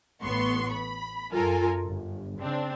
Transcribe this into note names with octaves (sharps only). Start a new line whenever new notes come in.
A1 A2 B3 C6 C#6
B5
F#2 F4 A4 A#4 G#5
G1
C#3 C4 D4